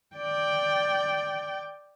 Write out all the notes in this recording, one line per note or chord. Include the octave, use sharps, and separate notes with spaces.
D5 G5